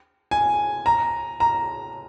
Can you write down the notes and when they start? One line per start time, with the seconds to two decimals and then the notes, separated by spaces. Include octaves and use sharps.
0.31 G#5
0.86 A#5
1.40 A#5